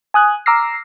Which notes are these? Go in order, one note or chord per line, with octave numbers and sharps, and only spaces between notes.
G#5 D#6 F#6 G#6
A#5 D6 E6 F6 A#6 C7